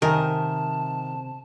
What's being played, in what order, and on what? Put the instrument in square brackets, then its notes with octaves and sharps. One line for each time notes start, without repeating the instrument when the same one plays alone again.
[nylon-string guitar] C3 D#5 G#5 [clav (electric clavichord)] D#3 [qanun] A#4 [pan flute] A5